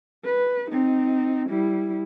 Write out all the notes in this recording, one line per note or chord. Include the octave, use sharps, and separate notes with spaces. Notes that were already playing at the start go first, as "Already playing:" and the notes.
B4
C4 D#4
G3 E4